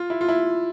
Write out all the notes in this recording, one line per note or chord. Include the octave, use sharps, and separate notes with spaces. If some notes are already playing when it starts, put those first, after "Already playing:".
Already playing: F4
E4
F4
E4